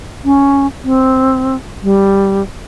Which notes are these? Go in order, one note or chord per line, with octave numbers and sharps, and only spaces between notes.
C#4
C4
G3